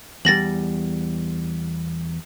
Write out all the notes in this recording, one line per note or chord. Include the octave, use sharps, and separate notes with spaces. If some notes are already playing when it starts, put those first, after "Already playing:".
E2 G3 A6 A#6 F#7